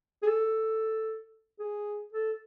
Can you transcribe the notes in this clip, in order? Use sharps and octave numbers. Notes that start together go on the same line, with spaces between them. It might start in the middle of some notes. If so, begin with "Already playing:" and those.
G#4
A4
G#4
A4